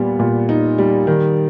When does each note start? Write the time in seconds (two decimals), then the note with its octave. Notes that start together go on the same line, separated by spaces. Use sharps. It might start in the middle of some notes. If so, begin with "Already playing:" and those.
Already playing: A#2 G3 B3
0.19 A#2
0.49 D#4
0.78 G3
1.07 D#3